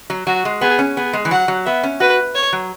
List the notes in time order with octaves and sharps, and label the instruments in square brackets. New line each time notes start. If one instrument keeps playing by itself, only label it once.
[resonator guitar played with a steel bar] F#3
[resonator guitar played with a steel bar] F#3 [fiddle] F#4
[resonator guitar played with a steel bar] G#3
[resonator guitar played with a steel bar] B3 [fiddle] G#4
[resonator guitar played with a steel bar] C#4
[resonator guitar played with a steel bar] B3 [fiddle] G#4
[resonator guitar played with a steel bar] G#3
E3
[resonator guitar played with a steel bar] F#3 [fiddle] F#5
[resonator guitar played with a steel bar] F#3
[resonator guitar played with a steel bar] B3 [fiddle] E5
[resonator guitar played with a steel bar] C#4
[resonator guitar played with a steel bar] F#4 [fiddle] B4
[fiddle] C#5
[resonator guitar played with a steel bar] F#3